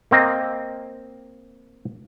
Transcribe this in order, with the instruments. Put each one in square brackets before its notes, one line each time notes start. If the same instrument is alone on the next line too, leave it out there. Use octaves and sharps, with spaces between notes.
[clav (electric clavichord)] A#3 C4 D#5